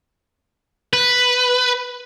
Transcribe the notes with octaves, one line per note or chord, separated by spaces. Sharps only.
B4